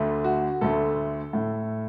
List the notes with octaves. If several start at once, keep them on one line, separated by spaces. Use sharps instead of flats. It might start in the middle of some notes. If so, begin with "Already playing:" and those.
Already playing: D2 D3 A3
F#4
D2 D3 A3 A4
A2 A3